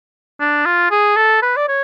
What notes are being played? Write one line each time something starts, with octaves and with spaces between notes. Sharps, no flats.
D4
F4
G#4
A4
B4
D5
C#5